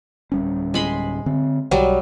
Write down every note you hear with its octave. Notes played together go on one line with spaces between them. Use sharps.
D1 G3 C#4
G#3 B5 C6
D3 C4
B1 F#3 G3